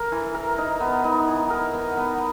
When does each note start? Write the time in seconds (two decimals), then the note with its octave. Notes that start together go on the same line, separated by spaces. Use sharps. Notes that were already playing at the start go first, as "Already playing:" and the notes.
Already playing: A#4
0.12 E3
0.34 A#4
0.58 D#4
0.80 B3
1.04 D#4
1.28 E3
1.50 A#4
1.74 B3
1.97 B3